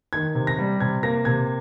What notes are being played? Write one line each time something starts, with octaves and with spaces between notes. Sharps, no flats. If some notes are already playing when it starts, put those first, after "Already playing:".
D#3 G#6
C3
A#6
G3
C3 G#6
A#3 A#6
C3 G#6